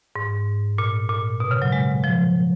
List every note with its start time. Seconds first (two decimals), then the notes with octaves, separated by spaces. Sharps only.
0.16 G#2
0.78 A#2
1.09 A#2
1.40 B2
1.51 C#3
1.62 F#3
1.72 G#3
2.04 F3